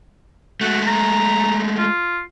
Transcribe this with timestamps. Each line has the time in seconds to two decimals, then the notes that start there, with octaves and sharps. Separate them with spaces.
0.61 G#3 A3 F#4
0.88 A#5
1.78 F4